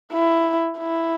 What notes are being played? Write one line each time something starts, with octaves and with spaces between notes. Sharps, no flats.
E4
E4